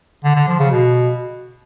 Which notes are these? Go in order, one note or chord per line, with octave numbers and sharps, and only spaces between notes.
D3
D3
F3
C#3
B2